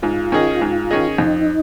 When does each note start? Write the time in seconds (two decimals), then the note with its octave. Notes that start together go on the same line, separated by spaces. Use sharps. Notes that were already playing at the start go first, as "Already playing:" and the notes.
0.02 G#2 F4
0.32 D#3 C#4 G#4 D#5
0.61 G#2
0.90 D#3 C#4 G#4 D#5
1.18 F2 D#4